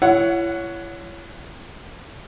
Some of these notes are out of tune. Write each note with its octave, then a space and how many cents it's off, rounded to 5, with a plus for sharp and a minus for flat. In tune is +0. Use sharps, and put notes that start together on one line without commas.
E4 +40 C#5 +15 F#5 -5